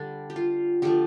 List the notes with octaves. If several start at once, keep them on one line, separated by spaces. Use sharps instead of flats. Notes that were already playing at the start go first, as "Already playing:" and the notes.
Already playing: D3 G3 D4
G4
F4
D3 F3 A3 G4